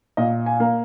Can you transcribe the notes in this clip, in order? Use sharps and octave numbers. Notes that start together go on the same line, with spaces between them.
A#2 D#5
G#5
A#3